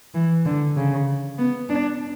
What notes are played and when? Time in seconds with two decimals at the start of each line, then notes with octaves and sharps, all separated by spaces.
0.14 E3
0.45 D3
0.76 C#3
1.38 B3
1.69 D4